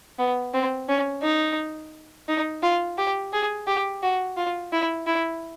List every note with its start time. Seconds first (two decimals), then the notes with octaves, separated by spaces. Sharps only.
0.19 B3
0.54 C4
0.89 C#4
1.23 D#4
2.28 D#4
2.63 F4
2.98 G4
3.33 G#4
3.67 G4
4.03 F#4
4.37 F4
4.73 E4
5.07 E4